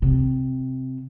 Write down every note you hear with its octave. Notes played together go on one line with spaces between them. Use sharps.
C3